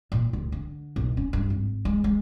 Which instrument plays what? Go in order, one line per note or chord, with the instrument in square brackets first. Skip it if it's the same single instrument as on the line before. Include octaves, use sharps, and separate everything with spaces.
[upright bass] A#2
D2
D3
B1
C#4
G2
G#1
G#3
G#3